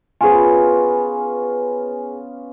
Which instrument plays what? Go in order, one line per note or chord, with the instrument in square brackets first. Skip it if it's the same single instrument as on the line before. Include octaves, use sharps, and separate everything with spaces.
[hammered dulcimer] B3 C#4 F4 [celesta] G#4 G#5